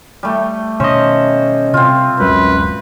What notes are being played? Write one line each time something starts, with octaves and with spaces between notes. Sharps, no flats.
G3 A3
B2 D#3 C#4 C5 D#5
C3 C4 F4
D1 C#2 F#2 G#3 B4